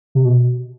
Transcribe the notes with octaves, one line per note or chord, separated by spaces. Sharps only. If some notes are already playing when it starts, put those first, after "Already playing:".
C3
B2